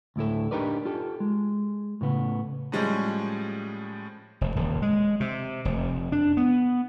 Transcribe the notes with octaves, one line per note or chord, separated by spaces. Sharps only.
D2 A2 E4 A4
D4 D#4 G4 A#4 B4 D5
F4 G4 A4
G#3
A2 C#3 B3
A2 F3 G3 G#3 C#4 G#4
F1
D#1
G#3
C3
F1
D4
B3